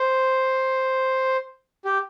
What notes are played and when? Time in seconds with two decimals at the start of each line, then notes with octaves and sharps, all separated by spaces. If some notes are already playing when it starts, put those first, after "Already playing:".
Already playing: C5
1.85 G4